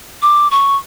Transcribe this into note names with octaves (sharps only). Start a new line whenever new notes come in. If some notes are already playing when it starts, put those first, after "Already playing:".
D6
C#6